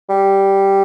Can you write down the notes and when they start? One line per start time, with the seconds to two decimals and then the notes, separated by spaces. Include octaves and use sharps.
0.10 G3